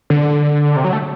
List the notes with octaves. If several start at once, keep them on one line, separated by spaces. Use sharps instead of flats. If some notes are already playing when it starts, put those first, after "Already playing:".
D3
C3
F#3
A3